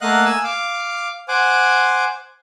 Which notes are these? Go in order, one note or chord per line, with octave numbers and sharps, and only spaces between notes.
A3 A#3 D#5 F5 F#5 F#6
G#5 E6
F5 D6
C5 F#5 G#5 D6